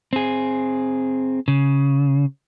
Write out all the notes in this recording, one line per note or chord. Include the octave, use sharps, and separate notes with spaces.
C4 G#4
C#3